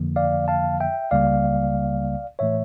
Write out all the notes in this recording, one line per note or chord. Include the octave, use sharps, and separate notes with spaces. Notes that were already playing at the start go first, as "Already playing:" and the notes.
Already playing: F2 D3 F3 A#3
D5 F5
F5 A5
E5 G5
C#2 C#3 G3 A#3 D5 F5
A2 E3 A3 C#5 E5